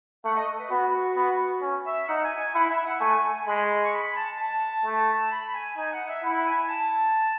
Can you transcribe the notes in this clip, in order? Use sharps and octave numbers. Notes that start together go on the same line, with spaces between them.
A3 F#5
D#5
B4
B3 F#4
B3
C#4
E5
D#4 F#5
G#5
G#5
E4 F#5
E5
F#5
A3 G#5
G#3 B5
C#6
B5
A5
A5
A3
B5
G#5
D#4 G#5
F#5
E5
E4 F#5
G#5
A5